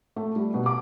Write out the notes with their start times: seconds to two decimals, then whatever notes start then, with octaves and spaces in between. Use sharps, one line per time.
0.16 A3
0.36 G3
0.54 B2
0.66 D6